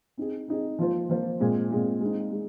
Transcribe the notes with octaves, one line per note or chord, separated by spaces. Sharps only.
C4 D#4 G#4
C4 D#4 G#4
F3 A#3 F4 C5
F3 A#3 F4 C5
A#2 G#3 C4
A#2 G#3 C4
G#3 C4 D#4
G#3